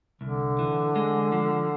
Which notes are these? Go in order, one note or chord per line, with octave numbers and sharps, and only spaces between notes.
C2 D3
E3
G#3
F3